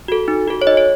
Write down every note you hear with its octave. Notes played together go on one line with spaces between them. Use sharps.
F#4 A4
D#4
F#4 A4
C#5
D#4 D#5
C#5